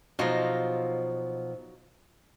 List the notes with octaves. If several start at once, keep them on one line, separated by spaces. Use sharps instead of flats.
B2 F3 F#3 D#4 F4